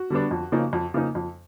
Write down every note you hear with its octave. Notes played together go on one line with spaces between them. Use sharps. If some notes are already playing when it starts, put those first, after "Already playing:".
Already playing: F#4
D3 G3 B3 D4
F2
C#3 F3 A#3 D#4
F2
C#3 F3 A#3 D#4
F2